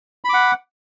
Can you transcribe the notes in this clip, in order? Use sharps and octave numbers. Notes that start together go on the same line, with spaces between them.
F#5 B5 D6